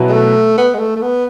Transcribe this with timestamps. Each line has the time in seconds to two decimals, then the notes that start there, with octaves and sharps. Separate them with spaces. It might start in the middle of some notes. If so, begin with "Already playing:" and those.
Already playing: B2 F#3 B3 E4
0.09 G#3
0.12 A3
0.58 B3
0.74 G#3
0.79 A3
0.96 A3
1.02 B3